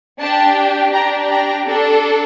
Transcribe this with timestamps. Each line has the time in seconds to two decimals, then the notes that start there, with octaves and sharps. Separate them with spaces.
0.20 D4 G4 A5
0.93 D4 G4 A#5
1.30 A#5
1.66 D4 A4